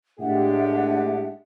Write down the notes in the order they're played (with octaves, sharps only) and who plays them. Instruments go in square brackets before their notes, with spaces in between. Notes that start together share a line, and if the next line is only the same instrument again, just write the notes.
[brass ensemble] A2 G#3 G4 [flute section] D4 E5 F#5